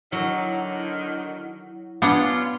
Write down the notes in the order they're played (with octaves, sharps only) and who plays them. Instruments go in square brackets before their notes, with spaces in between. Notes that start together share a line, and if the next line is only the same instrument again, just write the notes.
[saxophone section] D3 D#3 [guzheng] F#3 [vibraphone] E4
[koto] B3 D4 F#5 [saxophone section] C#4 F4